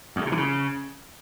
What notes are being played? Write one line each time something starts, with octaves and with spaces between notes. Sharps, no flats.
E2
A2
C3
E3
C#3